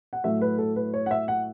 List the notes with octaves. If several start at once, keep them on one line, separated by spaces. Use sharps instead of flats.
F#5
A2 F#3 A3 E5
B4
A4
B4
C#5
F#5
E5
F#5